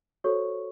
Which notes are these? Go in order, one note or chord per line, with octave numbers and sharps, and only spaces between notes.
F#4 A4 C5 C#5 C#6